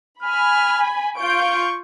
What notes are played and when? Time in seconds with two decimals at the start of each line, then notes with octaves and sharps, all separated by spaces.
0.23 G#5 B5 F6
1.18 F4 C#6 G6 D7